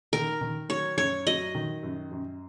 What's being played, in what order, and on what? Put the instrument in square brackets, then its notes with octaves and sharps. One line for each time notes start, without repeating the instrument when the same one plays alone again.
[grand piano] D#3 [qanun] A#4
[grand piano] D#3
[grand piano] F#3 [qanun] C#5
[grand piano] F#2 [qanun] C#5
[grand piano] F#3 [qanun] D#5
[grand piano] D#3
F#2
F#2